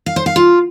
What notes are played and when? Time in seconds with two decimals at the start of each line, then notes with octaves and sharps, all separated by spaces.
0.06 F5
0.16 C5
0.26 F5
0.36 F4